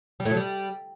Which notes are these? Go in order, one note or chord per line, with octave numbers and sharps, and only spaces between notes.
G3
A2
F#3
G3